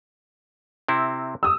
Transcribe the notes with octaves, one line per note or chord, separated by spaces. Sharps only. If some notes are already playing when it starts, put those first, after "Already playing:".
C3 C4 E4
D#6 E6